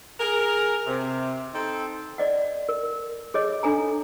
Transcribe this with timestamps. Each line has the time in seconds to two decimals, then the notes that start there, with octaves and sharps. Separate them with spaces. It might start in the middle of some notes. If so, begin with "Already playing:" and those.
0.19 G#4 A#4
0.87 C3
1.53 C4 D#4 A4
2.18 D5 D#5 F#5
2.69 A#4
3.34 G#4 C#5 D#5
3.63 D4 A4 G#5 A#5